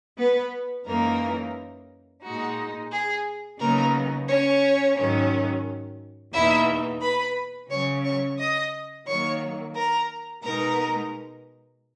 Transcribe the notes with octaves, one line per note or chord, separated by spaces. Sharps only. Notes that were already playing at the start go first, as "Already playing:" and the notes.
B3 B4
F#2 E3 G#3 A#3 D#4 A#4
A#2 G#3 D#4 F#4
G#4
C#3 F#3 A#3 B3 D#4 A#4
C#4 C#5
G#2 D#3 F#3 C#4
E2 B2 A#3 D#4 E4 E5
B4 B5
C#3 F#3 C#4 C#5 C#6
C#5 C#6
D#5 D#6
D#3 F#3 A#3 C#5 C#6
A#4 A#5
B2 G#3 B3 D#4 A#4 A#5